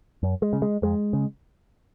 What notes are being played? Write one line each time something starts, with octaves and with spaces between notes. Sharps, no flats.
F#2
G#3
C#3
G#3
F2 G#3
C#3